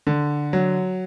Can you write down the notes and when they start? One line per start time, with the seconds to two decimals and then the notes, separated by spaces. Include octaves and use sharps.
0.07 D3
0.53 F#3